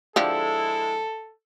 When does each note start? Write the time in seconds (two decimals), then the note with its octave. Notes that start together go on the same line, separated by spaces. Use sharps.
0.16 D3 F3 G#3 E4 G4 A4